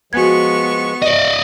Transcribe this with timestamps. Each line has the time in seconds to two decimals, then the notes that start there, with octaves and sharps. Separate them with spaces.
0.13 F3 G#3 B3 F#4 G#5 C#6 G#6
1.02 D5 D#5